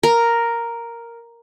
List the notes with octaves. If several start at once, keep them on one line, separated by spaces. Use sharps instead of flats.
A#4